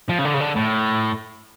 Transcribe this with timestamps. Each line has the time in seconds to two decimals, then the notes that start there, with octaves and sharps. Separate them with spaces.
0.09 F3
0.19 C#3
0.25 D3
0.34 C#3
0.40 D3
0.56 A2